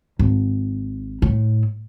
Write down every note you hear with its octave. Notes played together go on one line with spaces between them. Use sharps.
G#1
A2